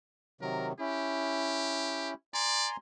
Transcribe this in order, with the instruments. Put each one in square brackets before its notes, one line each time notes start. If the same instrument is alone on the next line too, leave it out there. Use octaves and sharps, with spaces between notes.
[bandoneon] C3 D#3 F#3 [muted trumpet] A#4
[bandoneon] C#4 E4 [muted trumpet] G4
[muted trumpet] D5 [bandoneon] G#5 A#5 C6